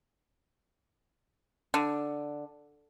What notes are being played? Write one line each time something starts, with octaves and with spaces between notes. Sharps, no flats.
D3